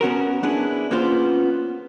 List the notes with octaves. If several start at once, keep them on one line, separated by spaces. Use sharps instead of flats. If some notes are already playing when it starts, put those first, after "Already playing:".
B3 C#4 F#4 A#4
B3 D4 E4 G#4
A#3 B3 C#4 F4 C5